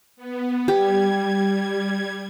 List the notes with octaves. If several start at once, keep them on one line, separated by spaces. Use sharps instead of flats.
B3
G3 G4 G#6